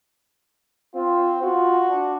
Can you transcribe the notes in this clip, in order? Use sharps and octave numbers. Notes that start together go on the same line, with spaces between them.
C4 F4
F4 F#4
D4